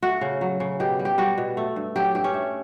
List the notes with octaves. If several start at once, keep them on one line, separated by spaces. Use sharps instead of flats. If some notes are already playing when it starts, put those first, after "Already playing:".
A3 F#4
C#3
F#3
C#3
B2 G4
G3
G4
G3 F#4
B2
A3
G2
F#3 G4
G2 G4
C#4
A3